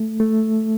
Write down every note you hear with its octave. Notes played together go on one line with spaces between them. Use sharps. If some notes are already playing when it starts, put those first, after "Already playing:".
Already playing: A3
A3